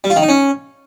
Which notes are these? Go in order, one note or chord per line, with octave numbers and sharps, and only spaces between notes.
G3
F4
D#3
D#4
C#4